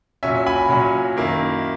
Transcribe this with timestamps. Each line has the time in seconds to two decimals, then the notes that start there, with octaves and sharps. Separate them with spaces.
0.23 A#2 F#3 C#4 E5 G#5
0.47 G#5 B5
0.69 A#2 F#3 C#4
1.16 F#2 D#3 A#3 E4